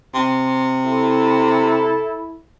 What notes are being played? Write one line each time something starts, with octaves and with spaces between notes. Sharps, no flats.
C3
E4 A4